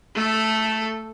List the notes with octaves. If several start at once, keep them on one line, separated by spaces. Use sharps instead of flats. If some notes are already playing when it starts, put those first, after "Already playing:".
A3 A4